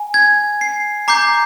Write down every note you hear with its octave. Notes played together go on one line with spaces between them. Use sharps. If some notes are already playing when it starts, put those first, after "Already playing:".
Already playing: G#5
G#6
C7
A#5 D6 G6 C7